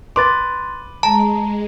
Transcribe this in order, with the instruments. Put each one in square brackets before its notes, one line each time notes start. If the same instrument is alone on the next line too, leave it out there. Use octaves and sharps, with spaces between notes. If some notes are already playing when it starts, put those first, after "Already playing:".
[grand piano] B4 D6 [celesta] C6 A6
[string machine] G#3 [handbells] A5 [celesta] A#5